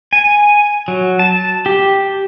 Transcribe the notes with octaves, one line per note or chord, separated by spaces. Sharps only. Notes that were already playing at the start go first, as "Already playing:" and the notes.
G#5
F#3
A5
G4